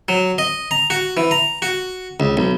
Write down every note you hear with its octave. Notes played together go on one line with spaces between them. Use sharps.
F#3
D#5
A#5
F#4
E3
A#5
F#4
C#2
B1